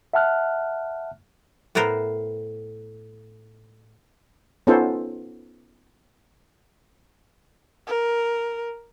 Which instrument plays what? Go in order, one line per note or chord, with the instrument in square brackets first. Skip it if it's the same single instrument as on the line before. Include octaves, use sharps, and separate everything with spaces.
[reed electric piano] E5 F#5 A5 F6 F#6
[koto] A2 B3 A4 A#4 C5
[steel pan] B3 C#4 D#4 F4 A4 C5
[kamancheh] A#4